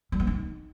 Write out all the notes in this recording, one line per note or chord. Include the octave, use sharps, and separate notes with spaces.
G3
B3
D#4